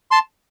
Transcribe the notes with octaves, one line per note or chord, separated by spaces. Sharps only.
A5 C6